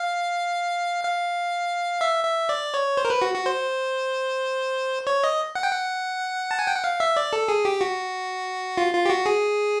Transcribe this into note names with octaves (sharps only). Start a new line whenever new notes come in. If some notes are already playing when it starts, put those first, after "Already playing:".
Already playing: F5
F5
E5
E5
D5
C#5
C5
A#4
B4
F#4
F#4
C5
C#5
D#5
F#5
G5
F#5
A5
G#5
G5
F#5
F5
E5
D5
A4
G#4
G4
F#4
F4
F4
G4
F#4
G#4